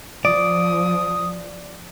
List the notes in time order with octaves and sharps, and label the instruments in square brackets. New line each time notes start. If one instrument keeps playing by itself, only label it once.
[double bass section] F3 [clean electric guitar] D5 [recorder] D#6